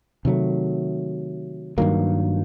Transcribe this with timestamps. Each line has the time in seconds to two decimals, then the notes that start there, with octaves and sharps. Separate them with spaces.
0.25 C3 D#3 F#3 A3
1.78 G2 D#3 F#3 A#3